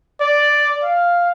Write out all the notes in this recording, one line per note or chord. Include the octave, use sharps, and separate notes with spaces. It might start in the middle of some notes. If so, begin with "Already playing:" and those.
D5
F5